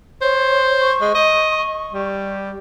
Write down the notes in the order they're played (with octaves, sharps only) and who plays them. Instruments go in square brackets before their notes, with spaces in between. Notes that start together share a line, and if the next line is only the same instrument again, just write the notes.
[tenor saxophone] C5 [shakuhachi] C#5
[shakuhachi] C#6
[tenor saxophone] G#3
D#5
G3